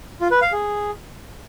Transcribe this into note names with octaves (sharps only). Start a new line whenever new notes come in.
F4
B4
F5
G#4